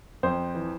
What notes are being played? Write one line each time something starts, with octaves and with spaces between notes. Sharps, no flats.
F2 C5
E3